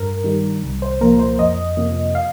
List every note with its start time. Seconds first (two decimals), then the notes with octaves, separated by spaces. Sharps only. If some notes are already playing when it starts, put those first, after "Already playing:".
Already playing: G2 A#4
0.24 D#3 G3
0.63 C2
0.82 C5
1.01 A#2 F3 A#3 A#4
1.19 C5
1.39 F2 D#5
1.77 C3 F3 A#3
2.15 F5